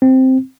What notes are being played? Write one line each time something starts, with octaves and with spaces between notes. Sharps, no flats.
C4